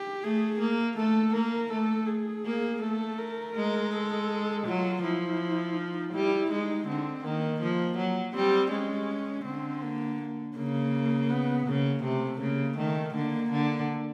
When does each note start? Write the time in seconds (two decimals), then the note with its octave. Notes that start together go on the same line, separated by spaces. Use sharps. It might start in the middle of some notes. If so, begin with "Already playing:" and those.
Already playing: G4
0.23 A3 G#4
0.60 A#3
0.97 A3 A4
1.34 A#3 A#4
1.71 A3 A4
2.07 G#4
2.45 A#3
2.82 A3 A4
3.18 A#4
3.56 G#3
3.92 A4
4.66 F#3 F4
5.03 F3 E4
5.76 D#4
6.13 G3 E4
6.51 G#3 D#4
6.87 D3 C4
7.25 D#3 A#3
7.61 F3 A#3
7.98 F#3
8.35 G3 C4
8.71 G#3 C#4
9.45 D3 C4
9.82 A#3
10.56 C#3 A#3
11.30 B3
11.66 C#3 A#3
12.03 C3 A3
12.40 C#3 A#3
12.77 D#3 A3
13.14 D3 A#3
13.51 D3